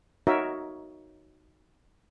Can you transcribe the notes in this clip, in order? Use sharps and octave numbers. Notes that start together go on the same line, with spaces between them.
D#4 F#4 A#4 C#5 E5